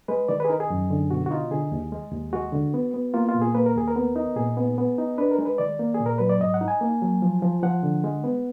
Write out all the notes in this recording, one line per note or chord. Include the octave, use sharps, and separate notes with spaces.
G#3 B4
D#3 D5
G#4 B4
D#4 A#4
G#4
F#2
D3
B2 F#4
F#4
D#4 F4
D3 G#4
D#2
G#3
D#2
G#3 F#4
D3
B3
B3
A#3 F4
F4
A#2
G#4
A#3 B4
A#4
D#2 G#4
A#4
B3
D#4
A#2 G#4
B3
B3
D#4
D4 B4
A#4
G#3
B4
D#3 D5
A#3
G#4
A#2
A#4
F#3 B4
D5
G#2 D#5
F#5
D#4
G#5
A#3
F#3
F3
F3
F3 F#5
D3
G#3
B3